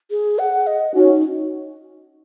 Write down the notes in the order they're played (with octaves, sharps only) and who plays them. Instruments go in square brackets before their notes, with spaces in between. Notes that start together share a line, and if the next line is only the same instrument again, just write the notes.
[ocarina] G#4
F#5
D#5
[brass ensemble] C#4 F#4 [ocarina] D#4